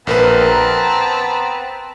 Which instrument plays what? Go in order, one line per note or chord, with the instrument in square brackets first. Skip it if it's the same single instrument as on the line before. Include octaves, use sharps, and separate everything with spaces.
[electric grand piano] A#1 A#4 B4 [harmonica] B3 C4 A5
[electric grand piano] A#5